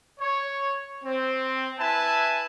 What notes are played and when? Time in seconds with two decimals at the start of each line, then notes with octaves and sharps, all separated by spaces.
0.20 C#5
1.04 C4
1.79 E4 B4 E5 G#5 A5